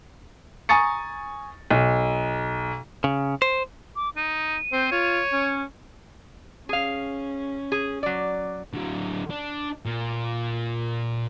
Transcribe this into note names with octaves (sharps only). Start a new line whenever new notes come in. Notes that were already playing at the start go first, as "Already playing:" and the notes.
G#5 A#5 C#6 D#6 A6 C#7
B1
C#3
C5
D6
D#4 D#7
C4 C5
F4 C#5
C#4
C#4 G#4 F5
G#4
F#3 D5
D3 F#3
D4
A#2